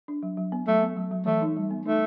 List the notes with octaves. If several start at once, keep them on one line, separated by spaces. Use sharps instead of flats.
D4
F#3
F#3
B3
F#3 A3
B3
F#3
F#3
E3 A3
D#4
G3
B3
A3 D#4